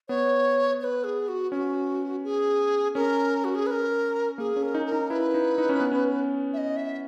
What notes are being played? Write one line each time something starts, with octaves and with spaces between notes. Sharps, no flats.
B3 C#5
C#5
B4
G#4
F#4
C#4 F#4
G#4
C#4 A#4
F#4
G#4
B4
A#4
A#3 G#4
C#4
A#4
D#4
A#4
D#4
E4 B4
D#4
D#4
C#4
B3
C#4
E5
D#5
E5